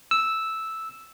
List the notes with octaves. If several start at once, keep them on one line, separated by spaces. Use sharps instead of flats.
E6